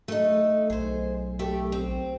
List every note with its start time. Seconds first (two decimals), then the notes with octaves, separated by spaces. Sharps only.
0.08 A3 D#4
0.70 B1 G#4 C5
1.39 A3 G4
1.72 C4